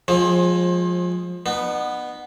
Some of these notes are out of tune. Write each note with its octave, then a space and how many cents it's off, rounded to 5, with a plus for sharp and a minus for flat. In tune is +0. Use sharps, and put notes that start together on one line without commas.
F3 +25 G#3 +0 C4 +35
B3 +0 D#4 -40